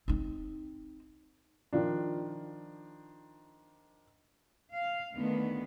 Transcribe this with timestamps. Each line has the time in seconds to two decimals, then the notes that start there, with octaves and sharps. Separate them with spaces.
0.08 C4 D#4
1.73 D#3 F3 D4
4.74 F5
5.14 D2 D#3 B3